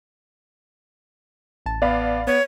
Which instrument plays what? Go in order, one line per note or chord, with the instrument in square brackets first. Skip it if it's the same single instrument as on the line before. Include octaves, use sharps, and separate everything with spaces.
[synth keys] A1 A5
[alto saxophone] B3 [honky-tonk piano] D5 F5 B5
[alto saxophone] B3 [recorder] C#5